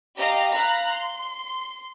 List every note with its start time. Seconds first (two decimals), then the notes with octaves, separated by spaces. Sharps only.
0.17 G4 D#5 F5 A#5
0.52 F5 A#5 B5 F#6
0.91 C6